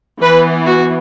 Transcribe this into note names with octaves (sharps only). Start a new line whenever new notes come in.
E3 B3 B4
F#4